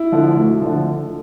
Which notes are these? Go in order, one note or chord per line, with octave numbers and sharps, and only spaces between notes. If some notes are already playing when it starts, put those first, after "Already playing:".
Already playing: E4
D3 F3
D2
D3 F3